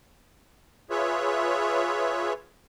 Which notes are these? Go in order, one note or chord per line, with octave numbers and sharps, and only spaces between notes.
F4 G#4 B4 C#5 E5